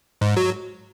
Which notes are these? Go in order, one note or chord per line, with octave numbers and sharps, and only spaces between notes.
G#2
F#3